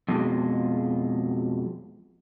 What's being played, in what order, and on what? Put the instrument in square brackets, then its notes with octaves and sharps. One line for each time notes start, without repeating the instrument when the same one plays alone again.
[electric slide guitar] F2 B2 G#3